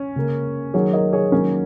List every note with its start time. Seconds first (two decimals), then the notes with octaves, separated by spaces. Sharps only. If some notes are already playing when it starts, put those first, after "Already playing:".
Already playing: C#4
0.16 C#3 A#3
0.74 D#3 F#3 A#3 G#4 C#5
0.93 A#4 D#5
1.13 G#4 C#5
1.32 D#3 F#3 A#3 C#4 F#4